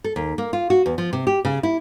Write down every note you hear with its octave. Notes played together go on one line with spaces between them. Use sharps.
A4
D#2
A#3
F4
F#4
E2
F3
C3
G4
C#3
E4